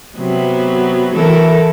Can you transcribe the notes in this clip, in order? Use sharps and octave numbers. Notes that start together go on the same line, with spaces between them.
C3 F#3 B3
E3 A4 A#4